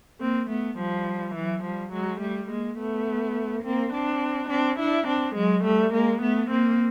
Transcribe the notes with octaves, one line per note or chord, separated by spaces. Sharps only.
A#3 C4
A3 B3
F3 G3
E3 F#3
F3 G3
F#3 G#3
G3 A3
G#3 A#3
A3 B3
A#3 C4
C4 D4
C4 D4
D4 E4
C4 D4
F#3 G#3
G3 A3
G#3 A#3
A3 B3
A#3 C4